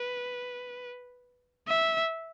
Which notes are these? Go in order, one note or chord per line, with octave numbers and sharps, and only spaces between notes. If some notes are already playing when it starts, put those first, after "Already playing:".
Already playing: B4
E5